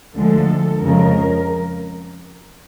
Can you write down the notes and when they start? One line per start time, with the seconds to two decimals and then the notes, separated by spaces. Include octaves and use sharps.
0.15 D2 D3 F3 G#3 A4
0.82 F2 C#3 F3 G#3 A#4